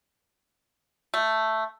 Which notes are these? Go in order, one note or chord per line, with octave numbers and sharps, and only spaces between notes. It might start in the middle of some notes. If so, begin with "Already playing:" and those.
A3